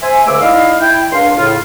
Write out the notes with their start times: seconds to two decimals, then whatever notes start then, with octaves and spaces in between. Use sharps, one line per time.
0.03 C5 E5 G#5
0.27 C#2 D3 A3 D6 E6
0.41 D#4 E4 D5 D#5 F5
0.81 E4 G5
1.12 C#2 D4 A#4 F5 C6
1.37 A2 C#3 F4